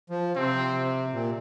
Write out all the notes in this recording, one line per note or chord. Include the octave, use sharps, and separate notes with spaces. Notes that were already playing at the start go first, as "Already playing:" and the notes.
F3
C3 C4
A#2